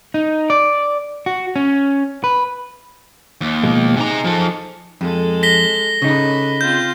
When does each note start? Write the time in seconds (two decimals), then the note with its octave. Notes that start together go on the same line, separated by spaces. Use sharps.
0.14 D#4
0.50 D5
1.26 F#4
1.56 C#4
2.24 B4
3.41 D#2
3.63 B2 F3 G#3
3.97 C3 D#4 G#4 A#5
4.24 F3 A4
5.01 F2 G#3 A4
5.43 A#6 B6 G7
6.02 C#3 D#4 A4 B4
6.61 C4 F4 G6